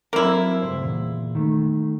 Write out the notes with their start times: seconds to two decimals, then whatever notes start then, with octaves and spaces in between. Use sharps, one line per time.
0.13 F#3 A#3 C4 E4 A4
0.62 C#2 G2 C5
0.82 E2 A#2
1.35 D#3 A3